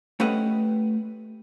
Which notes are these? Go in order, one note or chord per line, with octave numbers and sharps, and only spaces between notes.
A3 C#4 G4 B4 D#5 F#5